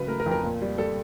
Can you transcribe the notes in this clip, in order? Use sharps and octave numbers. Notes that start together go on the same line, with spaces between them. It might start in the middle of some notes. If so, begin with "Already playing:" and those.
Already playing: G#2 C#3 F#3 B4
A3 A#4
A#4
F2
A#4
A#2
G3
G3 A4